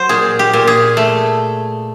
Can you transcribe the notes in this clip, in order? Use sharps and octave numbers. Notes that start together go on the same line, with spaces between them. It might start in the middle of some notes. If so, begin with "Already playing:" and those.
Already playing: F#3 C5
A#2 G#4
G4
A#2
G#4
A3